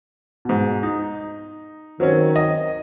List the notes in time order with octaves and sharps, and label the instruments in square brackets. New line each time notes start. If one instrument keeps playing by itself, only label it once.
[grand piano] G#2 B2
D#4
[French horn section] D#3 [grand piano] F#3 C4 C#4
[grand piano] D#5